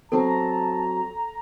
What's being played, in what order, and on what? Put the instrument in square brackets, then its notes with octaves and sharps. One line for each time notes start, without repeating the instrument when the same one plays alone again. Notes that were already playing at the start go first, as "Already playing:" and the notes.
[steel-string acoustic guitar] F#3 C4 [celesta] A4 [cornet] A5 [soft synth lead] A#5